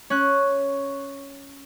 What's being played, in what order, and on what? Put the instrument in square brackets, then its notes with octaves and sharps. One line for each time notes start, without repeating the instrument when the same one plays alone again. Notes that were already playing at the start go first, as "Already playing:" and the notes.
[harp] C#4 F#6